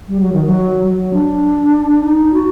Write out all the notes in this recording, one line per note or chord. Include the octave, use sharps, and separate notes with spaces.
G3
F#3
D#3
F#3
F#3
D4
D#4
F#4